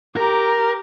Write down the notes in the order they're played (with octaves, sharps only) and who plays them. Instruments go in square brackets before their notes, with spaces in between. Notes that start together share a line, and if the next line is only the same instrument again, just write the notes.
[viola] G4 [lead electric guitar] A#4 [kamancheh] A#5